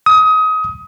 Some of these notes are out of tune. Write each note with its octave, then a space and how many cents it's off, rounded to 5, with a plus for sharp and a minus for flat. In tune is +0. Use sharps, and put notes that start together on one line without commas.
D#6 +25